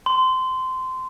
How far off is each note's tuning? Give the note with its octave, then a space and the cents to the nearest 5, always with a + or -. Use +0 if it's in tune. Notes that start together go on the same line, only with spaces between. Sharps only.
C6 -20